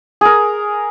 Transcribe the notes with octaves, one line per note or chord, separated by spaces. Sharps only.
G#4 A#4